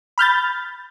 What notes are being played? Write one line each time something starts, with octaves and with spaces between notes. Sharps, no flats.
B5 F6 G6 A6